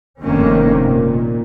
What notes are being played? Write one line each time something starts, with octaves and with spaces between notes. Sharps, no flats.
F1 G2 C3 D#3 A#3 C#4
A#2